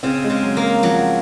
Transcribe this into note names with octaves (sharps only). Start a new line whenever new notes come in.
C#3 C4
G#3
C#3
F#3
A#3
F3 F#3